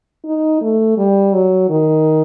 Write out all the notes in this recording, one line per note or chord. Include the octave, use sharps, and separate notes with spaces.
D#4
A3
G3
F#3
D#3